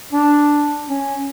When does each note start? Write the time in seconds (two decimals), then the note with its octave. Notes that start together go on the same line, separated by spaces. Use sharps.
0.13 D4
0.89 C#4